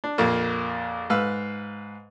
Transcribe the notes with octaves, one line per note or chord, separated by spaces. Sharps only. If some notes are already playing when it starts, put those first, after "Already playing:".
D4
A#1 F2 A#3
G#2 B4 F5 E6